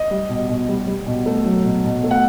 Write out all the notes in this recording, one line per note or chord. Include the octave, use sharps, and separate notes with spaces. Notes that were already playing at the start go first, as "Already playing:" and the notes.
Already playing: D#5
G3
B2
B2
G3
G3
B2
A3
F#3
B2
B2
A3
F#5